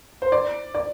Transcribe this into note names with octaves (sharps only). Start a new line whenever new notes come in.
C5
D5
D5